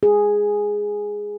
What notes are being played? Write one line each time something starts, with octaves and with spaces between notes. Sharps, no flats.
G#4